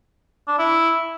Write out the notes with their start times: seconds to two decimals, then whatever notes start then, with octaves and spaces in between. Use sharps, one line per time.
0.48 D4
0.59 E4